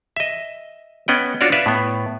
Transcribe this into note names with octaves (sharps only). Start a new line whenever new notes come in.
D#5 E5
B3 C#4 D#5 F#5 G5
D4 F4 F#4 C#5 D5
B4 D5 E5 F5
A2 B3